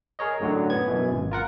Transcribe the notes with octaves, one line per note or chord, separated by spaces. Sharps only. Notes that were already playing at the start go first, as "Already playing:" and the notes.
G#4 A#4 C#5 D#5
F#2 A2 D3 F#3
B3 G#6
F#2 B2 E3
G#1
F4 A#4 F#5